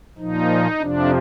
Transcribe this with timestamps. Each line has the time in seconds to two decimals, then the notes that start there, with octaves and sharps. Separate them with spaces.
0.18 A#2 F3 D#4
0.79 F2 C3 F3 D4